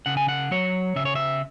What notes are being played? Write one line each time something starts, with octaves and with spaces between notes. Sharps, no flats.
C#3 F#5
G#5
F#5
F#3 C#5
C#3 E5
C#5
E5